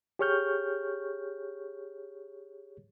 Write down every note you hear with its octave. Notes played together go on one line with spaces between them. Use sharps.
G4 G#4 C#5 C#6 F6 G6